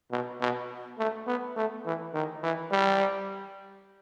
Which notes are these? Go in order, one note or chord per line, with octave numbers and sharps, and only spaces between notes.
B2
B2
A3
B3
A3
E3
D#3
E3
G3